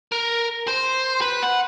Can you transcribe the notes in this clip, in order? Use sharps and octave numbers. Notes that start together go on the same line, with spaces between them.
A#4
C5
B4
F#5